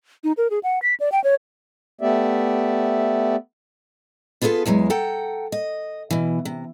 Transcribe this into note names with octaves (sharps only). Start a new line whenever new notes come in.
D#4
A#4
G#4
F#5
B6
D5
G5
C#5
A3 B3 G4 D5 E5
B3 F4 G#4 A4 B4
E2 E3 F#3 G#3
A4 F#5 G5 A#5
D#5
B2 E3
C3